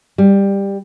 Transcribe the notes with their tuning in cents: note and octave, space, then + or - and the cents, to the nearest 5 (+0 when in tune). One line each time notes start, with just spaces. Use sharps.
G3 +15